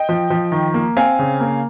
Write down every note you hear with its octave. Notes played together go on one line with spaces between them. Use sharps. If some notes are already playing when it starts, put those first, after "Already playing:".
Already playing: D#5 G5
F3
F3
D#3
A#3
C4 F5 G#5
C#3
A#3